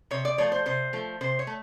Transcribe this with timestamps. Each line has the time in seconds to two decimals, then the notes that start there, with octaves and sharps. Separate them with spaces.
0.11 C3 C#5
0.25 D5
0.38 F3 A3 C#5
0.52 C5
0.66 C3 C5
0.93 F3 A3
1.21 C3 C5
1.39 C#5
1.47 A3